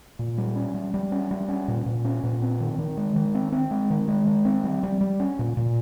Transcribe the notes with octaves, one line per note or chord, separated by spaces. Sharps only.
A#2
G3
C#4
G3
G3
C#4
G3
C#4
A#2
A#2
C#4
A#2
C4
D#3
D#3
G#3
D#3
C4
C4
G#3
D#3
G#3
D#3
C4
G3
G3
G3
C#4
A#2
A#2